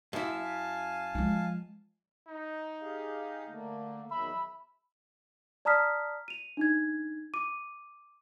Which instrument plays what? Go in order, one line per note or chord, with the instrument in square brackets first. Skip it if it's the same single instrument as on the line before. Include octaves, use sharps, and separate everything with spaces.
[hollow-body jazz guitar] F#2 E4 [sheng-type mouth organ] F5 G#5 A5
[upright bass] F3 G#3
[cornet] D#4
[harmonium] G4 G#4 F5
D3 A3 A#3
[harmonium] E2 D#3 F#3 [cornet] E5 [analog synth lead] B5
[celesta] D5 A5 A#5 D#6 F6 B6
D#7 F7
D4 D#4 G#6
D6 D#7